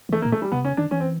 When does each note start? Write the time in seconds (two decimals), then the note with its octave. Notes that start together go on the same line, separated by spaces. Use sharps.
0.09 D#3
0.12 E3 A3
0.22 A#3
0.25 A#2
0.32 A3
0.42 G3
0.52 C3 B3
0.64 C#3 C#4
0.77 D#3 D4
0.91 E3 C#4
1.00 C4